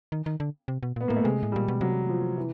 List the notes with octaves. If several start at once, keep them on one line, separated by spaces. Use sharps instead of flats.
D#3
D#3
D3
C3
B2
A#2 B3
A2 A#3
A3
C3 G#3
A2
A#2 G3
B2
C3 F#3
F3
E3